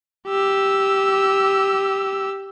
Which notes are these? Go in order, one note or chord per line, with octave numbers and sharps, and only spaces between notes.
G4 E6